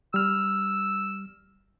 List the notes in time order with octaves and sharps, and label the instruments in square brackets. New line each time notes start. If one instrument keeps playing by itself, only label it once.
[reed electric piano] G3 F6 [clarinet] E6